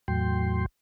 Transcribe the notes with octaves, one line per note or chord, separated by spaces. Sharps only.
E2 A2 F#3 G5 C6